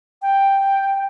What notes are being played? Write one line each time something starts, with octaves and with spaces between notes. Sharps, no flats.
G5